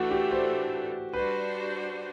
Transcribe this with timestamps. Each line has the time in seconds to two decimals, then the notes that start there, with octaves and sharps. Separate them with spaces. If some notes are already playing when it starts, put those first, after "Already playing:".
Already playing: E3 A3 D4 F#4 A4
0.11 G4
0.31 C5
1.13 G3 D4 F#4 B4 C5